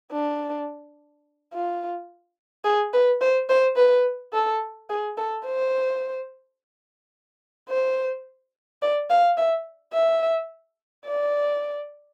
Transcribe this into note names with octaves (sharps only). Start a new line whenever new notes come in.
D4
F4
G#4
B4
C5
C5
B4
A4
G#4
A4
C5
C5
D5
F5
E5
E5
D5